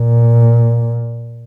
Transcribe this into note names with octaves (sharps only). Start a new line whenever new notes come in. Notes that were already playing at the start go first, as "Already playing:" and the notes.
Already playing: A#2